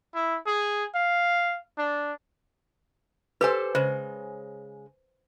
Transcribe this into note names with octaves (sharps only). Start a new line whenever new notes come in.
E4
G#4
F5
D4
G4 A4 B4 C5 G#5
C#3 G#3 C5